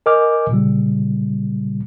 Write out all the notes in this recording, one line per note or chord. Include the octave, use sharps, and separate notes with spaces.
A#4 D#5 G#5 D6 F6 G6
A#2 C#3 G3